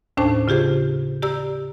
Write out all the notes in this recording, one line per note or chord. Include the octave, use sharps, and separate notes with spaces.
D#2 A2 C#4 D4 C5 A5
C#3 F4 G4 G#4 C5
G4 D5 A#5 E6